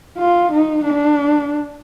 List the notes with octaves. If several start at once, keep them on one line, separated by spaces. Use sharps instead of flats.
F4
D#4
D4